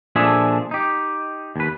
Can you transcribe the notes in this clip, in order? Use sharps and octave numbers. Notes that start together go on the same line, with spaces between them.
A#2 F3 D4 G#4 A4 E5
D#4 G4
D#2 B4